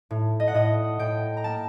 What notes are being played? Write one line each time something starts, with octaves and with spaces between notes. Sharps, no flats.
A2
D#5
F#5
A2 D#5
A2 G5
A#5
A#3 A5